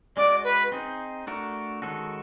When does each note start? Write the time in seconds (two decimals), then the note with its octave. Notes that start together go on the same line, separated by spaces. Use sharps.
0.16 G#3 C#4 F#4 D5
0.44 B4
0.72 C4 D#4 G#4
1.27 A3 D4 F#4 A#4
1.82 D#3 G#3 C#4 F#4 A4